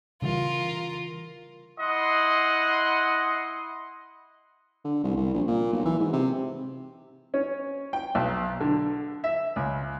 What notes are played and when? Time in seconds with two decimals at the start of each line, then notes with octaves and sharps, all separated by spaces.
0.22 C#3 E3 G3 F4 A#4
1.79 E4 D#5 F#5 C6
4.85 D3
5.04 C2
5.17 C2
5.34 A#1
5.48 A#2
5.73 B1
5.85 E3
5.99 G#2
6.13 C3
7.34 C#4
7.93 G5
8.15 B1
8.60 D3
9.24 E5
9.56 C#2